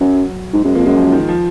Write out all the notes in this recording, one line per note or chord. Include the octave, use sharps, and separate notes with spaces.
F#2 F#3
G#2
F#2 G#3
F2 A#3
F#2 G#3
F3
D#3
F3